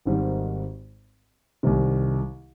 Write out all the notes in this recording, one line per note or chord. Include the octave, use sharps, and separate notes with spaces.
G#1 G#2 D#3 G3 C4
C2 C3 D#3